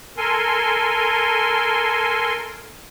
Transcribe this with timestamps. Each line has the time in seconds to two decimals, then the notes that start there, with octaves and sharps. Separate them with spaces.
0.17 A4 A#4 G#5 C6